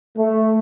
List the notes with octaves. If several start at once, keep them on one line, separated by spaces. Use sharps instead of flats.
A3